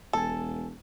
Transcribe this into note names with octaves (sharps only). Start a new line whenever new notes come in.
E1 A4 G#5 A5